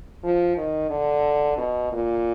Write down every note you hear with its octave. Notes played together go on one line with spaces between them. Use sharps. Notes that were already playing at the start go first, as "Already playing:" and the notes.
F3
D#3
D3
B2
A#2